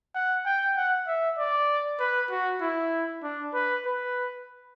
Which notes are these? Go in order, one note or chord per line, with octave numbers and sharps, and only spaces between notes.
F#5
G5
F#5
E5
D5
B4
F#4
E4
D4
B4
B4